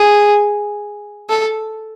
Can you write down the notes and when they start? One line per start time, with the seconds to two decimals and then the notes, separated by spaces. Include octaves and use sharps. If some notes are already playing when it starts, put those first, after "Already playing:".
Already playing: G#4
1.30 A4